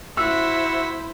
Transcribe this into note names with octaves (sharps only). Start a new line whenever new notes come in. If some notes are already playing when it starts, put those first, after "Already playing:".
E4 F#4 C5 E5 E6